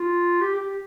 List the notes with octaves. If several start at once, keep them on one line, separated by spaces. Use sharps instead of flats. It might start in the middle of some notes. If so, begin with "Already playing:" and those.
Already playing: F4
G4
G4